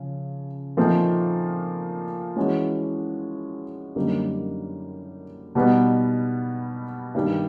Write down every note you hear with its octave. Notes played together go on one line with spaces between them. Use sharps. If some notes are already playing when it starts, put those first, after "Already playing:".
Already playing: C#3 F3
A#2 F3 A3 C4 D#4
E3 G#3 C#4 F#4
F#2 D3 G3 A#3 D#4
B2 G3 B3 D#4
G2 D#3 G3